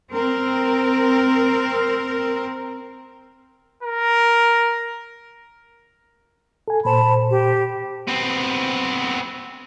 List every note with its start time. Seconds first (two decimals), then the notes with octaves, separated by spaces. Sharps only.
0.15 C4 A#4
3.83 A#4
6.68 A4 G#5
6.85 A#2 C5 A5 B5
7.31 G4
8.08 B3 C4